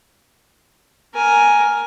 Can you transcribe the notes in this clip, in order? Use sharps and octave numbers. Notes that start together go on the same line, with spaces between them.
A#4 G#5